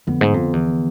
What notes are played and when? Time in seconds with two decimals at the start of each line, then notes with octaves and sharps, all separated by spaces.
0.07 F2 D3 F3 B3
0.21 G#2
0.34 F2
0.53 E2